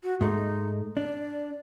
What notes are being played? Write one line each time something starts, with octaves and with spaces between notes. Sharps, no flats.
F#4
G#2 G#3 A3 D#4
D4 D5